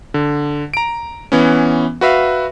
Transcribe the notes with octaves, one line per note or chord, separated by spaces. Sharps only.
D3
A#5 D7
E3 B3 C#4
F#4 B4 E5 F5